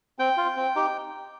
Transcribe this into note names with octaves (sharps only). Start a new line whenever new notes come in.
C4 G5
F4
C4
D#4 G4